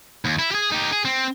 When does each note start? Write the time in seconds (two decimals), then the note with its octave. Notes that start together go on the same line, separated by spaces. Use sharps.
0.25 D#2
0.39 E4
0.51 G4 G#4
0.72 D#4 G4
0.93 G#4
1.05 C4